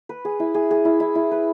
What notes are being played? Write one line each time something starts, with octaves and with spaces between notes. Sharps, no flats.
B4
G#4
E4
G#4
G#4
E4
E4
E4
B4